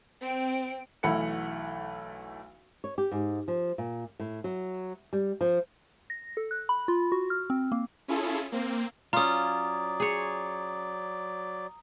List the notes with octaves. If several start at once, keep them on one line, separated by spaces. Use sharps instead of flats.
C4 D7
B1 E3 A3 F#5 B5 C#7
C#5
G4
G#2
F3
A#2
A2
F#3
G3
F3
A#6
A4
F#6
B5
F4
F#4
F6
C4
A#3
C#4 E4 F4 G#4 A4
A#3 C4
F#3 C#4 F4 D5 A#5 D#6
G#4 C#5